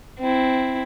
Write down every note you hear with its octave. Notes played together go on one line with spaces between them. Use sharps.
C4 E4